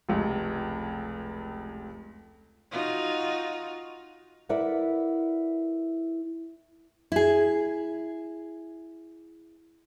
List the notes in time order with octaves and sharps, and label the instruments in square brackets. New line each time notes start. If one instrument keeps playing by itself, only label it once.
[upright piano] F1 C#2
[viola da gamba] D#4 F4 F#4
[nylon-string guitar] E4 A#4 B4 D5 E5 F#5
E4 G#4